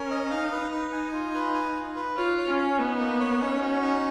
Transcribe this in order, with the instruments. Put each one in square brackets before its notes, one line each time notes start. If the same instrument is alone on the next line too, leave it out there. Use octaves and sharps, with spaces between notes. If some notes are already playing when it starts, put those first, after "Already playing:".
Already playing: [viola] C#4 [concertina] A#4
[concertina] D#5
[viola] D#4 [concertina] F5
[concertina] B4
[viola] D#4
[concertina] B4
G#5
F4
B4
G#5
F4
B4
[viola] F4 [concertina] C#5
[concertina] C#5
[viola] C#4
[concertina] C#5
[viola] B3 [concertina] D#4
[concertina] A#3
C#5
[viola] C#4 [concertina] D#4
[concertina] F#4
D#4